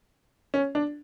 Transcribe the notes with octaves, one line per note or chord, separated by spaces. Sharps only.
C#4
D4